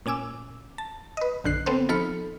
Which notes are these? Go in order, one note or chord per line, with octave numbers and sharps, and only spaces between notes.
A#2 C#4 G#5 D6 E6
A5
B4 D#5
A#1 F#2 D3 F#6 C7
B3 C4 A4 C5
F3 D#4 A4 B5 F6 C#7